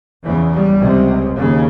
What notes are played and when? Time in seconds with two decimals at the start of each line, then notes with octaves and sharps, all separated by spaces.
0.24 E2 C#3 E3
0.54 G3
0.81 C#2 C3
1.37 D#2 C#3